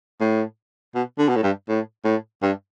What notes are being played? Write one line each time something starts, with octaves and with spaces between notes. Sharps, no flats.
A2
B2
D3
B2
A2
G2
A2
A2
G2